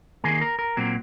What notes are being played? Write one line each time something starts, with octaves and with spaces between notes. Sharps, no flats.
D#3 A#3 G#4
A#4
A#4
A#2 F#3 A#3 C4